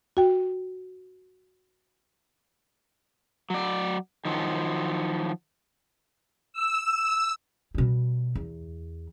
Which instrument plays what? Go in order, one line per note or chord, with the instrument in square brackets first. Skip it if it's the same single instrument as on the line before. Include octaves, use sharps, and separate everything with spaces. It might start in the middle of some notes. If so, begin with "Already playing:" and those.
[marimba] F#4 G5
[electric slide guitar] F#3 D5
D#3 F3 F#3
[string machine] E6
[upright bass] B2 G3
E2